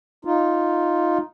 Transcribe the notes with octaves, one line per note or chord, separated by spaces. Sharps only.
D#4 F4